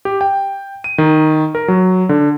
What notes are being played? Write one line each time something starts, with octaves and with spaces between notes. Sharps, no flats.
G4
G5
D#7
D#3
A#4
F#3
D3